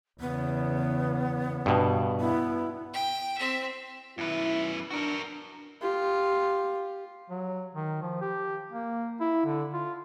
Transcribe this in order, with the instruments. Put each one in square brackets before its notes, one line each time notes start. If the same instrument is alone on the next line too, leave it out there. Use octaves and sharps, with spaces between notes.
[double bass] E2 C#3 [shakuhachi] B3
[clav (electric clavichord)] G2 B2
[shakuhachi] B3 [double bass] E4
[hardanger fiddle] G5
C4 E5
[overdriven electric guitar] F#2 B4 [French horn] E4
[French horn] D4 [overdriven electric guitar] F#4 A#4
[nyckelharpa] F4 G4
[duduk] F#3
D#3
F3
G4
A#3
E4
D3
F4